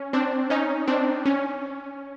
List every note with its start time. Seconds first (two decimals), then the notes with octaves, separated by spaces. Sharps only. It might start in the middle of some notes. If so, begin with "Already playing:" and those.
Already playing: C#4
0.13 C4 D4
0.50 C#4 D#4
0.88 C4 D4
1.25 C#4